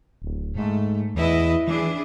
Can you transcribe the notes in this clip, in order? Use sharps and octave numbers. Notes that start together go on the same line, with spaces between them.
D1
G#2 A3
E2 E4 B4 D#5
E3 D4 E4 G#4